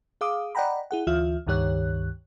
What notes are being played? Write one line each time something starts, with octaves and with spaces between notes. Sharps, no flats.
G#4 F5 D6 D#6
D5 D#5 F#5 G5 A#5 B5
E4 G#4 F#5
D2 E3 F4 E5 F6
C#2 G2 D#3 G4 C#5 F#6